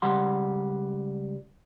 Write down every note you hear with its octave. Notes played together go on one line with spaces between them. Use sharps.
C#2 G3 F#5 C6